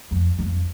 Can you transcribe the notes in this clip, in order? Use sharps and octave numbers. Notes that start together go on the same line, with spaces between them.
F2
F2